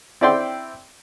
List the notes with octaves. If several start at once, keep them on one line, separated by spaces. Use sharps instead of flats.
C4 E4 D5 G5 C6